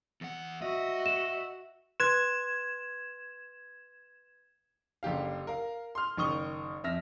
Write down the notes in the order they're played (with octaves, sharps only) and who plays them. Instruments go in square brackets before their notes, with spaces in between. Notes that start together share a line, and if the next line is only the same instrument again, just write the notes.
[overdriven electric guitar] E2 F#5
[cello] F#4 [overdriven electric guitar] D#5 [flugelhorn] E5
[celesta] E7
[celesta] B4 C6 F#6 [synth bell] G#6 E7
[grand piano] F#1 D3 G4 F5
A#4 F5
C6 F6
F#1 D#3 C#6 D#6 G7
F2 E5 F6 A#6